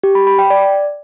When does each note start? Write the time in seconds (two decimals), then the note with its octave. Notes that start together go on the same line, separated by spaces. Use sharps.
0.03 G4
0.15 B5
0.27 B5
0.39 G5
0.50 D5